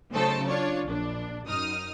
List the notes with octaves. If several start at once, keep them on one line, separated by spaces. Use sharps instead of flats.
C#3 F#3 A3 D#4 A4 C5
D4 F4 C#5 D5
A#1 D4
F#2 D#4 D#6 F6